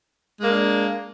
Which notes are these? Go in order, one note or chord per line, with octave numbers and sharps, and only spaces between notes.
G#3 A#3 D4